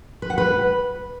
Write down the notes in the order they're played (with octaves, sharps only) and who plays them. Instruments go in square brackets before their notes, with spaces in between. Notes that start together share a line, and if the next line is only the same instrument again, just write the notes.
[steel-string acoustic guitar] B4
F#5
B4